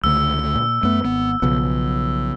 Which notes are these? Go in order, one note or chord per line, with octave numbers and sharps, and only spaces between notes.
C#2 D3 A3 E6
A#2
F#2 A3 B3
G#1 B3
B1 C#3 F3 B3